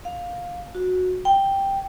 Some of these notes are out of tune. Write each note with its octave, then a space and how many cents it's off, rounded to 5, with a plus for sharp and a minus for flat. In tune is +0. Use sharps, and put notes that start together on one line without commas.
F5 +15
F#4 -10
G5 +5